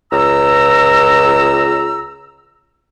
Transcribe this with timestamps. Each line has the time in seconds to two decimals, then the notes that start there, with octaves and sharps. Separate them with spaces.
0.12 C#2 A#5 E6